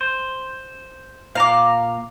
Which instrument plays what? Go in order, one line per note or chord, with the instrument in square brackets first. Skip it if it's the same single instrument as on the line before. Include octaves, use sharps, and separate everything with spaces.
[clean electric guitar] C5
[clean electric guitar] A#2 A#5 [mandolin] F5 D6